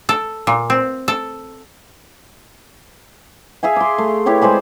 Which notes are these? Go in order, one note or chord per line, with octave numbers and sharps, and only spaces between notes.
A4
A#2
C4
A4
G#4 E5 F5 G#5
C6 D6
A3
E4 G4 B4 C#5
G#3 C5 D5 G#5